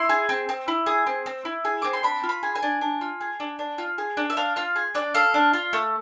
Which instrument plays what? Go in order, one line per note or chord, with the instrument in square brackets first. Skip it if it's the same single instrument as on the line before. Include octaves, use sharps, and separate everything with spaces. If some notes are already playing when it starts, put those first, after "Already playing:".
Already playing: [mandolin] E4 C6
G#4
C4
C4
E4
G#4
C4
C4
E4
G#4
C4 D6
C6
D4 B5
F4
B5
G#4
G#5
D4
D4
F4
G#4
D4
D4
F4
G#4
D4
E5
D4 F5
F4 F5
G#4
D4 D5
A4 F5
D4
F4
A3